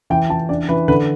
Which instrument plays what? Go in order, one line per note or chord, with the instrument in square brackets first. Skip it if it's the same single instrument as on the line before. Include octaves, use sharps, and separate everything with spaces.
[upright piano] E3 G5
E3 A5
D4 D5
E3 B4
D3 B4